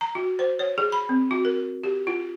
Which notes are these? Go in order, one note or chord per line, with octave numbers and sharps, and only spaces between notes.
A#5
F#4
C5
C#5
G#4
B5
C4
F#4
A#4
G4
F4